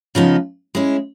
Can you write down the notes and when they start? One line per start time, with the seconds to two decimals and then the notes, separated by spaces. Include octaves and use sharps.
0.15 C#3 F3 G#3 B3 D#4
0.75 G#3 C#4 E4